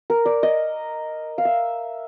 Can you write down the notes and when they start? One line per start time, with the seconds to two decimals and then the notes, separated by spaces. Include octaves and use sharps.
0.10 A#4
0.25 D5
0.43 D#5
1.38 F5
1.45 E5